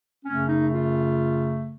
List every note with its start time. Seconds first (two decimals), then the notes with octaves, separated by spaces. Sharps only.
0.25 F#2 C#3 A3 C#4
0.48 D#4
0.72 F4